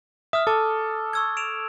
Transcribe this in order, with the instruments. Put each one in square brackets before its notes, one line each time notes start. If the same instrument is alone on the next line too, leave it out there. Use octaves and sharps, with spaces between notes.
[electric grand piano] E5 [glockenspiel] D#6 F6
[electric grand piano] A4 [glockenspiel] A5 D6
[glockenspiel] C#6 E6 G#6
D7 E7 F7